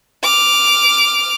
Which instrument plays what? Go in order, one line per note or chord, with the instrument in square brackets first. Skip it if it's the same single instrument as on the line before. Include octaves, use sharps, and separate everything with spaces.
[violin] D6 F6